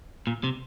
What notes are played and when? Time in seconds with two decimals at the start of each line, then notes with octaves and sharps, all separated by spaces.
0.27 A#2
0.44 C3